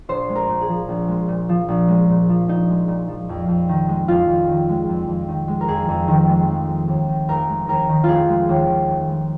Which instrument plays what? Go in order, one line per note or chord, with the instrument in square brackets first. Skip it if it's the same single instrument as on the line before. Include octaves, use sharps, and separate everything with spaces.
[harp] A#1 C5
G#3
A#4
A#2
G#4
F3
A#1
G#3
A#2
F3
A#1
G#3
A#2
F3
A#1 D#4
G#3
A#2
F3
F2
F2
D#3
G#3
F2 F4
F2
D#3
G#3
F2
F2
D#3
G#3
A#4
F2 G#4
F2
D#3
G#3
F1
G#3
D#2
D#3
F1 A#4
G#3
D#2 A#4
D#3
F1 F4 G#4
G#3
D#2
D#3
F1
G#3